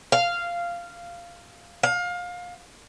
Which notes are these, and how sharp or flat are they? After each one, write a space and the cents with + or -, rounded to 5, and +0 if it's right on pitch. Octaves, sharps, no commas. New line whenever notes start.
F5 -10
F5 +25